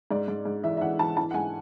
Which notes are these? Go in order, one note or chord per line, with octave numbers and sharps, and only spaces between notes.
G#2 D5
G#2
G#2
E3 E5
E5
E3 F#5
E3 A5
E3 A5
F#5
G#2 G#5